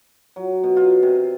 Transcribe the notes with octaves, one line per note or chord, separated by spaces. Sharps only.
F#3
B2
F4
C3